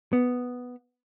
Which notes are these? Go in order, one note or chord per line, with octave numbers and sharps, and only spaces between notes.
B3